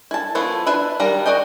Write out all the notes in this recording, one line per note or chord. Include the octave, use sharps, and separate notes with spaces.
E4 A5
F3 A3 B3 E4 A4
D4 B4 E5 B5
D#3 G3 D4 A#5
F#4 C5 D5 D#5 G5